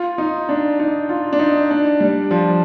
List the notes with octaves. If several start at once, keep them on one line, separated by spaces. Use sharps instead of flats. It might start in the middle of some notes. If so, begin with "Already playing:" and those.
Already playing: F4
D#4
D4
D#4
F4
D4
D#4
D4
G3
F3